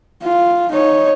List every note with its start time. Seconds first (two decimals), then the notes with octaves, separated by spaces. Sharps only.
0.23 F4
0.71 D#4 C#5